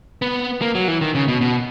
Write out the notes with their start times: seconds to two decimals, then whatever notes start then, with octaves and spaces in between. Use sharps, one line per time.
0.22 B3
0.62 A#3
0.75 F#3
0.88 E3
1.01 D#3
1.15 C#3
1.28 B2
1.41 B2